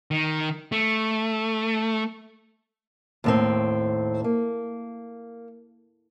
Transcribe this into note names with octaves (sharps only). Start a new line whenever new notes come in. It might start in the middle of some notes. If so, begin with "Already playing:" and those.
D#3
A3
D#2 A2 C4
A#3